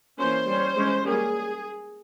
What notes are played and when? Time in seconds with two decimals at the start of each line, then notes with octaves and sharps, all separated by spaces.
0.19 E3 A#3 C#4 C5
0.48 G3 C#4
0.75 E3 G#3 C#4
1.04 G3 A#3 C#4 G#4